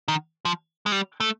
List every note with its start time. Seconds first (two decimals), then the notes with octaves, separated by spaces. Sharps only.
0.08 D#3
0.45 F3
0.86 G#3
0.92 G3
1.20 A3